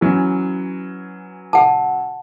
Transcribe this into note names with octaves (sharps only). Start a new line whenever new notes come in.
E3 F#3 C#4
F#5 A5